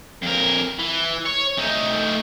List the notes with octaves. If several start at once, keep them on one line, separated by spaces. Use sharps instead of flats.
F2 A#4
E3
C#5
A3 D#4